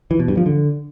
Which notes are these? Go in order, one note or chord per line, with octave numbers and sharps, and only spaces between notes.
E3
B2
G2
F3
D3